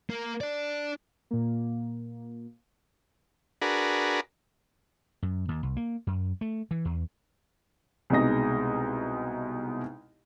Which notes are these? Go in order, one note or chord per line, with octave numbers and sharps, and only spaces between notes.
A#3
D4 D5
A#2 A#3
D4 F#4 G#4 A#4 B4
F#2
D#2
C2
A#3
F#2
A3
E3
E2
C2 B2 G#3 D#4 A#6